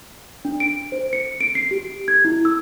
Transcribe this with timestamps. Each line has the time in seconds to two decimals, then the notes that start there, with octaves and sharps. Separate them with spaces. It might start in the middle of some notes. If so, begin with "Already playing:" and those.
0.45 D4
0.60 D7
0.92 C5
1.13 C#7
1.41 D7
1.55 C7
1.71 G4
2.08 G#6
2.25 E4
2.45 E6